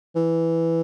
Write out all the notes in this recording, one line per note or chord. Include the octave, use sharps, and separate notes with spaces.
E3